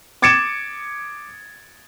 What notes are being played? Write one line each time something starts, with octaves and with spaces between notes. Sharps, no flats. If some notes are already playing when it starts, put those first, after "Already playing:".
D6 G#6 A6 C#7 D7 E7